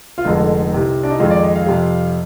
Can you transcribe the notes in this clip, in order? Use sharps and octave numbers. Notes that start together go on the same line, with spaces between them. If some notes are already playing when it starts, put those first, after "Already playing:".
F4
F1 F2 D3 G#3 D#4
C2 C3 G3
D4
D#4
F2 D#3 G#3 F4
D5
D#5
F5
F2 C3 G3